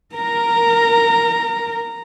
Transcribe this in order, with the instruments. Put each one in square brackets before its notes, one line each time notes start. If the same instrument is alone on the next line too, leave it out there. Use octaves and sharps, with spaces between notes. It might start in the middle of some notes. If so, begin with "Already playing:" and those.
[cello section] A#4 [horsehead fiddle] A#5